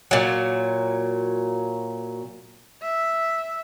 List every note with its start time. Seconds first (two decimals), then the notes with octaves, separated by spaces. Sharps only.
0.11 A#2 F#3
2.82 E5